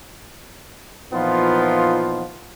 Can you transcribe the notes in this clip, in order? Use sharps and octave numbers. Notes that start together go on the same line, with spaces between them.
A#2 E3 F3 B3 D#4 F4